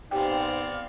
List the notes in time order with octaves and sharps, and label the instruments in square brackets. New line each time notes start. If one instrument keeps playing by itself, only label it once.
[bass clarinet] G#2 [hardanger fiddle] B3 C4 [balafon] G4 G5 [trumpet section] D5 F5